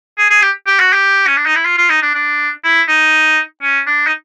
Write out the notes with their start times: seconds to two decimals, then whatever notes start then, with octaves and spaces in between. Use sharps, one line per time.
0.18 G#4
0.30 G#4
0.42 G4
0.67 G4
0.80 F#4
0.93 G4
1.27 C#4
1.37 D4
1.46 D#4
1.55 E4
1.65 F4
1.77 F4
1.89 D#4
2.02 D4
2.15 D4
2.64 E4
2.88 D#4
3.62 C#4
3.87 D4
4.07 D#4